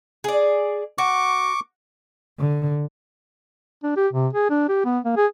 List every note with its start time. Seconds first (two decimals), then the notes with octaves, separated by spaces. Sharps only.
0.24 G#4 D5
0.98 F#4 C#6 D6
2.39 D3
3.83 D4
3.96 G4
4.13 C3
4.33 G#4
4.50 D4
4.69 G4
4.85 B3
5.04 A#3
5.17 G#4